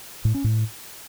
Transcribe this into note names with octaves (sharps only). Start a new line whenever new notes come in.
A2
C#4
A2